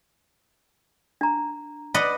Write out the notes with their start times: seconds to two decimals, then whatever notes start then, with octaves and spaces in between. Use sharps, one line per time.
1.21 D4 A#5
1.94 B4 D5 D#5 F#5 B5 D6